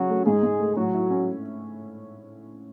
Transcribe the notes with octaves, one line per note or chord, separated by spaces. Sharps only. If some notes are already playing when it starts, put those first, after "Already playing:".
Already playing: C#3 F#3 C#4 F#4
A3
G#2 G#3 G#4
G#2
A3
A2 F#3 F#4
E4
C#4